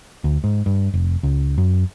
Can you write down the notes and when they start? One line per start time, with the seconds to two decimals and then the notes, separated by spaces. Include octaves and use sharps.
0.24 D2
0.44 G#2
0.66 G2
0.94 F1
1.23 C#2
1.58 F#2